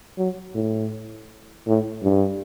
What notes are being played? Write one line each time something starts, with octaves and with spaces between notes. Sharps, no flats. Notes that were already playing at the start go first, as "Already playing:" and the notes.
F#3
A2
A2
G2